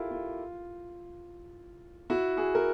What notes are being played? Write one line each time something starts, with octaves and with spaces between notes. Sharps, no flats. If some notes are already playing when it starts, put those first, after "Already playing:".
Already playing: E4 F4 G4 A4 A#4
F4
E4 F#4
F#4 G#4
A#4